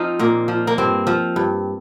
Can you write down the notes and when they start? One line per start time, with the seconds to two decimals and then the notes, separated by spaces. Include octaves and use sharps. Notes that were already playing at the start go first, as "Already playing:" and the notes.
Already playing: F3 C4 D#4 F4
0.19 A#2 A#3
0.48 F3
0.67 A#3
0.78 G2 C4
1.07 F3
1.36 G2